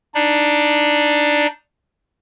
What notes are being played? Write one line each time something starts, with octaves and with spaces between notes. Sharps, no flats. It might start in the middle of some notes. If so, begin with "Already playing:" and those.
D4 D#4 D5